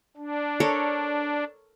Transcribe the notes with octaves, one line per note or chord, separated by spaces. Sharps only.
D4
A4 A#4 C#5